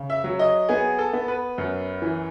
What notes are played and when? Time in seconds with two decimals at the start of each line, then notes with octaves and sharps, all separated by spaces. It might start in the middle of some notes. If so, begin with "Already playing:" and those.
Already playing: C#3
0.10 E5
0.24 F#3
0.39 D#5
0.69 B3 G#4
0.99 A4
1.13 B3
1.28 B4
1.58 F#2
2.02 E3